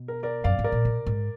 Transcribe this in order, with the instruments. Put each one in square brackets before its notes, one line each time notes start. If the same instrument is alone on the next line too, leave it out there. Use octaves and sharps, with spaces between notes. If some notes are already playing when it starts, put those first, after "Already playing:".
Already playing: [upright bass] B2
[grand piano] A#4
A#4 D5
[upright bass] F#2 [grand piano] D5 F5
[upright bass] G#2
[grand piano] A#4 D5
[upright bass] A#2
B2
G#2